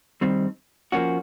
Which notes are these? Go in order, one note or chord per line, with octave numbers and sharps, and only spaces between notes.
G2 D#3 G3 C4
F3 A#3 C#4 F#4